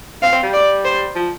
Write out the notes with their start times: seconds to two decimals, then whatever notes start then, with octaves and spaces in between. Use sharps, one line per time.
0.22 C4 F5
0.32 C4
0.43 G3
0.54 D5
0.85 C5
1.15 F3